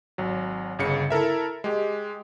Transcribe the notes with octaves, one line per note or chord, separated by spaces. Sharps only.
G#1 F#3
G1 C#3 C#7
E4 A4 A#4 E5
G#3 G4